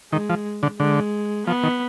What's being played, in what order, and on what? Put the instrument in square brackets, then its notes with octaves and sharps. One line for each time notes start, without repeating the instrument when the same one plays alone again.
[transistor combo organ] D#3 [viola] G#3
[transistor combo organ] F3
D3
[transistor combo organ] D3 [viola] G#3
[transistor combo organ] F3 [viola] B3
[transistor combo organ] D#3